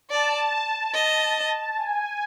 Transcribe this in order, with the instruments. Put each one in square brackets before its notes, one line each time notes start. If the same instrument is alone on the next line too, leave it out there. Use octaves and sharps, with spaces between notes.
[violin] D5 [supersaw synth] A5
[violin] D#5
[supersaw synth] G#5